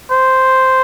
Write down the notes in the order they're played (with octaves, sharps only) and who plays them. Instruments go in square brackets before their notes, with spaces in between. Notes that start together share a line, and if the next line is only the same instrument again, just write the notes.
[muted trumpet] C5